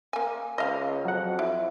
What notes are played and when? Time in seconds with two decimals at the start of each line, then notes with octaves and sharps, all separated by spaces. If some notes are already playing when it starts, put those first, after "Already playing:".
0.13 A#3 G#5
0.58 C#2 D#5 F5
1.05 F2 F#3 F#5
1.39 E4